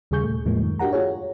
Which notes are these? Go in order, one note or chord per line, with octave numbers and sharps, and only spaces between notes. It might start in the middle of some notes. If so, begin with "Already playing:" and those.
D#2 C#3 G3 G#4 C#6 G6
A#2 A3
E2 A2 F3 G#3 A#3
F#2 D#3
D4 F#4 G4 A#4 F#5 A#5
F4 F#4 G#4 C#5